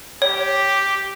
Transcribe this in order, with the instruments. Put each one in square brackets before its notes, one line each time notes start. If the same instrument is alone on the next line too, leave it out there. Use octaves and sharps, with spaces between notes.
[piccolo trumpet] G4 [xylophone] C#5